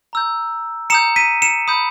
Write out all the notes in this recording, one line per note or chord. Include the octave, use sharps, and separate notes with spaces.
A#5 E6 G6
A#5 D#6 G6 C#7 E7
B6 D#7
C#7 E7
B5 D#6 G6